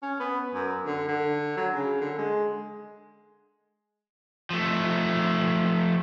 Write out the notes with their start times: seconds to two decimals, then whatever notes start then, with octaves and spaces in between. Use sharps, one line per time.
0.02 C#4
0.20 B3
0.54 F#2
0.86 D3
1.08 D3
1.57 F#3
1.74 C#3
2.01 D3
2.18 G#3
4.50 F3 A3